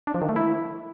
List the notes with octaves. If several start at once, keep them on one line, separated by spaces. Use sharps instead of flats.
D4
F3
D#3
A3
E4